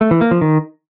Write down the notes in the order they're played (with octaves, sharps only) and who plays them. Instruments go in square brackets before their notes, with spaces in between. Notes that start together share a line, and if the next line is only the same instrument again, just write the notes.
[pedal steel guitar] A3
E3
A#3
F3
D#3